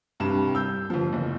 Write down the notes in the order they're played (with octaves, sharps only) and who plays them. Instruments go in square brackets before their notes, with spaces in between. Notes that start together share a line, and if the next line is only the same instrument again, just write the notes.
[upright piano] C2 G2 C3 E7
E6 G6
G1 F3
F#1 E2